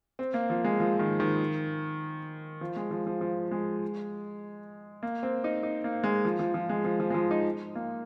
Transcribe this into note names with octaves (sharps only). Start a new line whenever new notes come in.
C4
A#3
F3
G#3
F3
D#3
D#3
F3
G#3
F3
F3
F3
G#3
A#3
C4
D#4
D#4
A#3
G#3
F3
F3
F3
G#3
F3
F3
G#3
F3
D#4
A#3